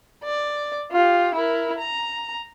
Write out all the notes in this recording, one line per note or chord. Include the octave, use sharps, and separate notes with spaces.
D5
F4 G4
E4 A#4
A#5